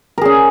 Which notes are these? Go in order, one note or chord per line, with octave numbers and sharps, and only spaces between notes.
C#4 G#4 A#4